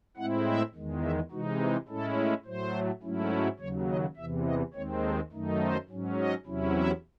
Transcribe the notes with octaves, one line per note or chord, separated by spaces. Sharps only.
A2 G#3 C4 E4 F#5
E5
E2 D#3 G#3
E5
C3 E3 G#3 D#4 F#4
G#4
A2 G#3 C#4 E4 A4
A2 F#3 A3 C5
G#2 F#3 A3 C#4 E4
D#2 C#3 F#3 C#5
D#5
E2 C3 E3 E5
D#5
D#2 D#3 G#3 C4 C#5
A4
F#2 D#3 A3 D#4
C5
G#2 F#3 C#4
D#5
E2 C3 F#3 C#4 E4
E5